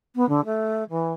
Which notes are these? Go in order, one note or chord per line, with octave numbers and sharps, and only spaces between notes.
B3
D3
A3
E3